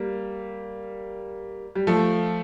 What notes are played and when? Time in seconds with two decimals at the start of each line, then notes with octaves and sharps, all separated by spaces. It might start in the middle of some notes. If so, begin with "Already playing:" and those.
Already playing: G3 A#3
1.75 G3
1.87 F3 A3